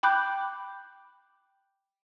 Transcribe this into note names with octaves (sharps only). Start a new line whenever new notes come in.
G5 B5 D6 F#6 G6